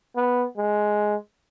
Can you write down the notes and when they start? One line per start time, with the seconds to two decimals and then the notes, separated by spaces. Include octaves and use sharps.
0.16 B3
0.58 G#3